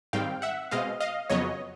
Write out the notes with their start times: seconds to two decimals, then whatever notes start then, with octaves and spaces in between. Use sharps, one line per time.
0.13 G#2 D#3 G3 C4 F5 G5
0.42 E5 F#5
0.71 B2 G#3 C4 D#5 F5
1.00 D#5 F5
1.30 F2 C#3 F#3 B3 C#5 D#5